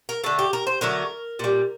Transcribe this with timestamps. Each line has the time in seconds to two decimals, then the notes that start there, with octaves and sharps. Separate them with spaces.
0.09 A#4
0.24 D3 A3 A4
0.39 G4
0.53 A#4
0.67 C5
0.81 D3 F#3 A3 A#4
1.39 A#2 G3